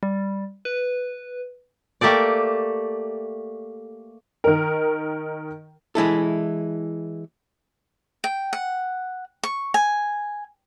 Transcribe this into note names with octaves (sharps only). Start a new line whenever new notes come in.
G3
B4
A3 A#3 G4 A4 D5
D#3 A#4
E3 G#3 E4 A4
G5
F#5
C#6
G#5